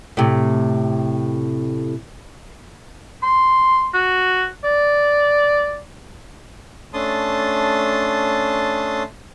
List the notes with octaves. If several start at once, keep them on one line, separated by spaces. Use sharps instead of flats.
A2 C3
C6
F#4
D5
A3 C#4 D4 A5 C6 D#6